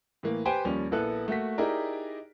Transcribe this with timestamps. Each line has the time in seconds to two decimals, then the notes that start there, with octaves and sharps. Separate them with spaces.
0.23 A2 E3 A#3
0.45 G4 B4 C5 G5 G#5
0.65 D#2 F3 G3 C#4
0.91 A#1 A#3 B3 E4 A4 F#6
1.28 A3 A#3 F#4 B6
1.58 D#4 E4 G4 G#4 A#4 D5